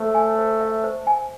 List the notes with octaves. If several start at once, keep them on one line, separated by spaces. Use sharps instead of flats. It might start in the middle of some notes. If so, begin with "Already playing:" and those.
Already playing: A3 C5
G#5
C5
E5
C5
G#5